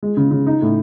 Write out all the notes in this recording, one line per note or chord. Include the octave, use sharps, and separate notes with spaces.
G#3
C#3
C#3
D#4
A2